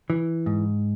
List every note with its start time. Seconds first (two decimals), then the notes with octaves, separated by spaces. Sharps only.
0.10 E3
0.46 G#2